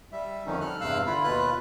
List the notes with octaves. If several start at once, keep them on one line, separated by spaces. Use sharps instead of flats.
G3 E5
F2 D3 D#3 F3 C#4 D#4
G3 A4 F6 F#6
E2 G2 C3 F5 E6 F#6
D3 E4 F4 B5
D#2 B2 F4 B4 F#6